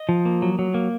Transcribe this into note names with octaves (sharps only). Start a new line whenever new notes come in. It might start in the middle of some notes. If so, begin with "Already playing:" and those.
Already playing: D#5
F3
A#3
F#3
F#3
A#3